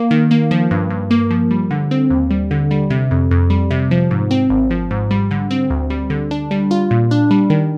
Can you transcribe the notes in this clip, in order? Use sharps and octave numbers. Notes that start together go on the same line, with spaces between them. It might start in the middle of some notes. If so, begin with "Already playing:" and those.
Already playing: A#3
D#3
A#3
F3
G2
G2
A#3
F3
G3
D3
C4
D#2
G3
D3
G3
C3
F2
F2
G3
C3
F3
G#2
C4
G#1
F3
G#2
G3
D3
C4
D2
G3
D3
D4
G3
F4
A#2
D4
G3
D#3